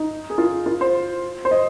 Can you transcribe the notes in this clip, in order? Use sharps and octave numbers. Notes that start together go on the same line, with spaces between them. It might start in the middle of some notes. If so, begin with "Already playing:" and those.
Already playing: D#4
G#4
F4
F4
C5
C5
D#5